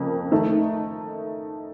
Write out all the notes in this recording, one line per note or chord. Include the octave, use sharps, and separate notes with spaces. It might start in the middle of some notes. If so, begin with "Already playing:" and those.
Already playing: F2 C#3 A#3
D#3 A3 D#4